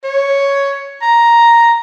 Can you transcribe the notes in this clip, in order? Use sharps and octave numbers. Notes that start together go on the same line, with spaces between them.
C#5
A#5